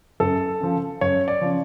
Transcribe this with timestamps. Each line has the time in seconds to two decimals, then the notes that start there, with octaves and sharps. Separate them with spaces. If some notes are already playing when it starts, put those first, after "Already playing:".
0.20 F#2 A4
0.60 C#3 F3
1.01 F#2 C#5
1.28 D5
1.41 C#3 F3